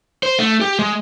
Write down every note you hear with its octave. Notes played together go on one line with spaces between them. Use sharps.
C5
A3
G4
G#3